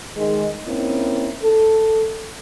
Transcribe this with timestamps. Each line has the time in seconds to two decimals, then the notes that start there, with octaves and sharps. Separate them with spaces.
0.17 D#3 G#3
0.67 A#3 C4 C#4 D#4 E4
1.43 A4